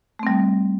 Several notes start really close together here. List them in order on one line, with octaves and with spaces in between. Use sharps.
A3 C4 G3